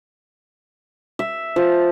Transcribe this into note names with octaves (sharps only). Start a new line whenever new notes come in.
E5
F3